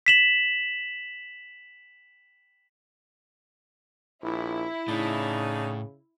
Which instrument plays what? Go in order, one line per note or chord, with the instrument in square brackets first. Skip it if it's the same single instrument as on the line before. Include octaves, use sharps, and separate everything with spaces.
[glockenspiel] B6 E7 F#7
[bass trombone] A#1 [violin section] E4
[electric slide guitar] A2 [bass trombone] C#3 [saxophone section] D4 D#4